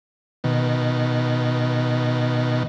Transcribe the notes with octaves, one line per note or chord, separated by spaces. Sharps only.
B2 D#3